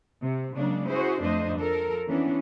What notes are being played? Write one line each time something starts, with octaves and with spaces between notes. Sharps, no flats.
C3
C#3 F#3 G#3 A#3 D4
E4 F#4 G#4 C5
F2 A3 D4 C5 D#5
F3 A4 A#4
E3 B3 C#4 D4